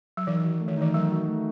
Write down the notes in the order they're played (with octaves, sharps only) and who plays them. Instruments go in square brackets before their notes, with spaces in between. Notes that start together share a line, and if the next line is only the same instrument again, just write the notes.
[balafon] F#3
[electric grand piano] D#3 [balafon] E3
[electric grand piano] F#4
A3
[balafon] D#3
[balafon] E3 [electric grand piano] D#4
[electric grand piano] D#3 [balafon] F#3
[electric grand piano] F#4
A3